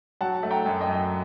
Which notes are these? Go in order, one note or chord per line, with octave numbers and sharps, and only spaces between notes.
F#3 F#5 A5
A3
G5 A#5
F#2
D#5 G5
F#2